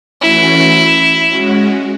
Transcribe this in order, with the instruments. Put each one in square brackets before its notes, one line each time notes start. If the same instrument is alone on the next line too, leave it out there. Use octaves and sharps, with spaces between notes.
[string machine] E3 A3 C#4 F#4 [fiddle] E4
[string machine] G#3 C#4 F#4